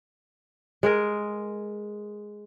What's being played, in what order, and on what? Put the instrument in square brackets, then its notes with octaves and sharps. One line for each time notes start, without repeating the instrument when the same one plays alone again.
[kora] G#3 G#4 A#4